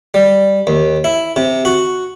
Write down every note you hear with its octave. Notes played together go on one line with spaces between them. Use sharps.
G3
D#2
E4
C3
F#4